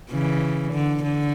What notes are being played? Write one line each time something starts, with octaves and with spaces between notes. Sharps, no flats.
C#3 E3
D3
D3